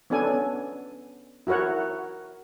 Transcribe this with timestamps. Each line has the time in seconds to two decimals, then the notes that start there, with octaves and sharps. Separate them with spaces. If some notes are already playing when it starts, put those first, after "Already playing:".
0.10 B3 C#4 D4 A4 G#5
1.47 E4 F#4 A#4 C#5 F#5